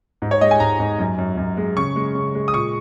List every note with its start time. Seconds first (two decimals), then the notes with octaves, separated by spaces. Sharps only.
0.22 G#2
0.31 C#5
0.41 G#3 D#5
0.51 G#5
0.60 G#2 A#5
0.79 G#2
0.99 F#2
1.18 F#2
1.37 F#2
1.57 G#3
1.76 C#3 C#6
1.96 G#3
2.15 C#3
2.35 G#3
2.48 D#6
2.54 A#2 C#6